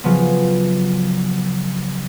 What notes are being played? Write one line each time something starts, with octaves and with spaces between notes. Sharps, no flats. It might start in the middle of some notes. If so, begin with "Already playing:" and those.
C#3 F3 F#3 B3